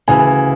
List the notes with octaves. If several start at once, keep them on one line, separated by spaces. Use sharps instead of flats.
D2 C#3 E3 G#5